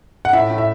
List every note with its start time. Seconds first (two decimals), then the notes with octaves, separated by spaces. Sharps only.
0.25 F#5
0.33 A2 E5
0.50 A2
0.58 E5